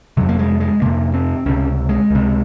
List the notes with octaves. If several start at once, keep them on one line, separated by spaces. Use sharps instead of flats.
F2 C3 F#3
A#3
G#3
G#3
F2 C3 A#3
C4
C#2 C3 C#4
G#3
C#2 C3